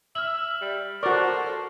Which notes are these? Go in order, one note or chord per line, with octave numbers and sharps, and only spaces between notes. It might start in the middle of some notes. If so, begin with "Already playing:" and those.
E5 F6 F#7
G3
F#4 A4 A#4 C5 D5 C#6